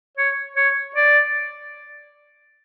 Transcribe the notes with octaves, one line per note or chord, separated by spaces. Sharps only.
C#5
C#5
D5